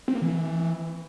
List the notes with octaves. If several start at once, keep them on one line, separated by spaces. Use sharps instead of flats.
C4
A#3
E3